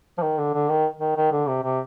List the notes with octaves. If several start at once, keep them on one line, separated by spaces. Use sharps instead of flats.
F3
D#3
D3
D3
D#3
D#3
D#3
D3
C3
C3